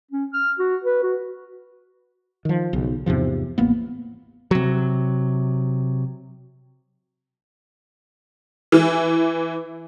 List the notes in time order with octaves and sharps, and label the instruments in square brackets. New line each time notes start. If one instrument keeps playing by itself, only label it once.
[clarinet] C#4
F6
F#4
B4
F#4
[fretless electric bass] D#3 F3
B1 C#3
E2 G#2 C3 F3
A1 A#3 B3
[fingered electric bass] C3 F#3
[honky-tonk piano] E3